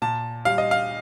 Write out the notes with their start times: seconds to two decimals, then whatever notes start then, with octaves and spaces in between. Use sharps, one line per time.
0.02 A#2 A5
0.45 G3 F5
0.58 D#5
0.71 F5